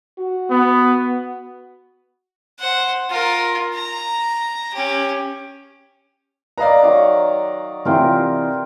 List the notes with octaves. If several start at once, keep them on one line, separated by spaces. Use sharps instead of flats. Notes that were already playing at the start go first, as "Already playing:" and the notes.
F#4
B3
C5 F#5
F4 A#4
A#5
C#4 G4
B4 D5 D#5 F5 A#5
D#3 F#3 F5 D6
C3 E3 F4 A#4 E5 G5